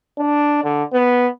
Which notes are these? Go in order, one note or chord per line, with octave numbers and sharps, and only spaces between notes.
D4
D3
B3